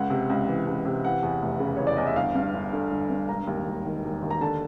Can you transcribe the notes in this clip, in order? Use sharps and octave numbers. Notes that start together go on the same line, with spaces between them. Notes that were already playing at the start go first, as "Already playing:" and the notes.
Already playing: C#2 F#5
C3
C#2
E3
C#2
C3
E3 F#5
E2
F1
C#3
E3 C#5
D5
E2 D#5
E5
G1 F5
G2
G1
D3
G1
G2
E1 A#5
D#2
E1
D#3
E1
D#2
A#5
D3 A5